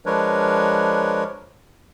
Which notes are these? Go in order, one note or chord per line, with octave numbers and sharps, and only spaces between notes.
F3 G#3 D4 A#4 B4 C#5